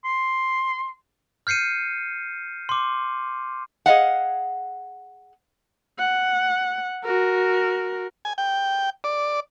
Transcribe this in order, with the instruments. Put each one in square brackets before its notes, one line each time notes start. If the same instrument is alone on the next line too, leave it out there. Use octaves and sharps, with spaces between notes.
[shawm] C6
[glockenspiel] F6 G6 C7 C#7 D#7
C6 D6
[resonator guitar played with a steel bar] G#4 D#5 F5 F#5
[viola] F#5
F#4 A#4
[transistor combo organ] G#5
G5
D5